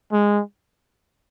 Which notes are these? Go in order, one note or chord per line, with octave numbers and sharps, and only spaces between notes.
G#3